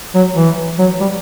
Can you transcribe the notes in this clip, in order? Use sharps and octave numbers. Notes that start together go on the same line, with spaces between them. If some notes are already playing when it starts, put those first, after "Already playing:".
F#3
E3
F#3
G3